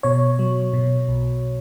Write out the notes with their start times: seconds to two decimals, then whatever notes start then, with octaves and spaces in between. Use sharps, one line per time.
0.03 B2 C#5
0.39 F#3
0.73 B2
1.08 B1